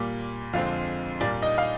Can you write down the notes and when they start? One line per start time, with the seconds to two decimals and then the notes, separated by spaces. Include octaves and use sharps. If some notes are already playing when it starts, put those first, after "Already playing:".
Already playing: A#2 G3 A#3
0.53 F2 D3 G#3 C4 F4 F5
1.20 A#2 G3 A#3 D4 D5
1.42 D#4 D#5
1.58 F5